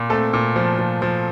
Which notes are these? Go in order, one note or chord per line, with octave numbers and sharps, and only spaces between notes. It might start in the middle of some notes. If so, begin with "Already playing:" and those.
Already playing: A#2
A3 C4 A4
A#2
F3
F3
F3